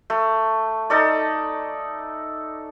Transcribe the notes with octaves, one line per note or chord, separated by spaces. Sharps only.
A3
D#4 A4 D5